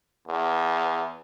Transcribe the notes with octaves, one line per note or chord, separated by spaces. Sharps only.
E2